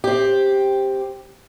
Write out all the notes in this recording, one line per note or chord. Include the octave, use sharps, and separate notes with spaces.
C4 G4